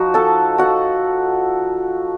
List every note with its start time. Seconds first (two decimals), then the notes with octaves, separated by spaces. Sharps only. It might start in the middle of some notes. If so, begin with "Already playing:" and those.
Already playing: F3 D#4 F#4
0.14 A4 A5
0.58 F#4 F#5